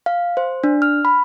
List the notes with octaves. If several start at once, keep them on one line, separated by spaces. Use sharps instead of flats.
F5
C5
D4
F6
B5